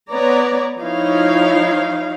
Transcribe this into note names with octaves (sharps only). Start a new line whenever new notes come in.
B3 C#5 D5 A#5
F3 D#4 E4 C#5 F5